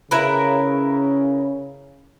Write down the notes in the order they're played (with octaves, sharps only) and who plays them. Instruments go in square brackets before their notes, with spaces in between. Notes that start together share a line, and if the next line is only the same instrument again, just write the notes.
[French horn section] C#3 [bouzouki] E4 A#4 B4